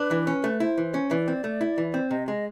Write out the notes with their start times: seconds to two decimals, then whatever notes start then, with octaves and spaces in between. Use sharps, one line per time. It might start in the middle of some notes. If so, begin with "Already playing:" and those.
Already playing: D4 B4
0.11 E3
0.27 C#4
0.44 A3
0.60 E4 C5
0.78 E3
0.94 C#4
1.11 E3 D5
1.28 C4
1.44 A3
1.61 E4
1.78 E3
1.94 C4
2.10 C3 D#5
2.28 G#3 D#5